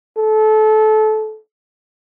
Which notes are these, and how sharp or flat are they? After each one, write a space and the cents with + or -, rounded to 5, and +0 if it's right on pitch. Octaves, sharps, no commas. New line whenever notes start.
A4 -25